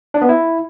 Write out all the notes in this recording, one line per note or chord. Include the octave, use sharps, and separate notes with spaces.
D4
B3
E4